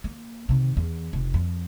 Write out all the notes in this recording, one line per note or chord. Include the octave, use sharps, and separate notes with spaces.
A#3
C3 D#3
E2
F1
F2